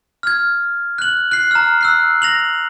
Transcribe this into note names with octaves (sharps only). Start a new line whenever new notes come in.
F6 G#6
F#6 F#7
F#6 C7
A#5 F6
E6 F#6 C7
A#6 F7 F#7